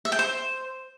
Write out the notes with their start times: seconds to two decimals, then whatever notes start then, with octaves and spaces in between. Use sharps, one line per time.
0.05 E5
0.12 G5
0.19 C5